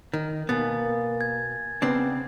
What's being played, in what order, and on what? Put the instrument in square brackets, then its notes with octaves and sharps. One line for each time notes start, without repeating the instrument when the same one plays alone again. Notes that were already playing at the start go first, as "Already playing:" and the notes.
[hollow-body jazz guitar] D#3
[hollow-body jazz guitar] B2 B3 [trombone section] A#3 [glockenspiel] G#5 A6
[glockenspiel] G#6
[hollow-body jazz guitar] C#3 C4 D4 [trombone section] B3